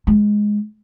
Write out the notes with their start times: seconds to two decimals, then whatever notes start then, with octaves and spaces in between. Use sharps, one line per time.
0.07 G#3